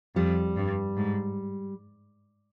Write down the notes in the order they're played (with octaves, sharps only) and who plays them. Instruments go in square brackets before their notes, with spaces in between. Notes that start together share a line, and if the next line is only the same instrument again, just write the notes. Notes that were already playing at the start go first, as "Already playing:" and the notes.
[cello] F2 [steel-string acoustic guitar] G3
[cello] G2
G#2